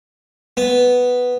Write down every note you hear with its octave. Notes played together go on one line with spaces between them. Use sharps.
B3